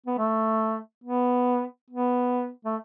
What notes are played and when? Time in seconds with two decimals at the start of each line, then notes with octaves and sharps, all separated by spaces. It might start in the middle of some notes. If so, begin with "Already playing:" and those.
0.06 B3
0.18 A3
1.04 B3
1.91 B3
2.65 A3